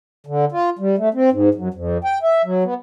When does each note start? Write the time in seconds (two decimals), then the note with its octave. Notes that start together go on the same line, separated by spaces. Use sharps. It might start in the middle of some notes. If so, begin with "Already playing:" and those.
0.27 D3
0.52 F4
0.79 G3
0.98 A3
1.14 C4
1.32 G#2
1.55 F#2
1.74 F2
2.04 G5
2.23 E5
2.45 F#3
2.64 B3